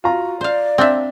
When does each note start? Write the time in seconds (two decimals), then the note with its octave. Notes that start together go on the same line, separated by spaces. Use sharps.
0.04 F4 F#4 A#5
0.41 C5 D5 F5
0.78 C4 D4 E5